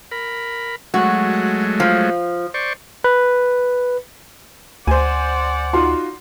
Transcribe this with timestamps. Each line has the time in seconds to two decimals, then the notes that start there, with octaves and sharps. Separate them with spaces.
0.11 A#4 B5
0.94 F#3 G#3 A3 F#4
1.80 F3
2.54 C5 D5 C#6
3.04 B4
4.87 D2 C5 D5 F#5 G#5
5.73 D#4 F4 F#4 C6